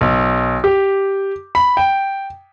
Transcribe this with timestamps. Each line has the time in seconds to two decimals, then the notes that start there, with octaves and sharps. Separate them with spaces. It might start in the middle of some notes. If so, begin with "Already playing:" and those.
0.01 B1
0.64 G4
1.55 B5
1.77 G5